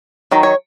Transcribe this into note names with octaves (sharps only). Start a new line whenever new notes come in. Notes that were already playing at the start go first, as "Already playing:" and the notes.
D#3 F#3
C#5